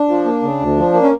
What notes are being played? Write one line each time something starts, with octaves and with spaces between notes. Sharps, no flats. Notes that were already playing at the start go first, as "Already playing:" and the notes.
Already playing: D4
F3
A#3
C#3
D2
F3
A#3
C#4